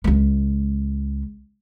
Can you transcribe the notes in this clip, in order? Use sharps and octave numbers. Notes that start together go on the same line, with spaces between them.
C#2 G#3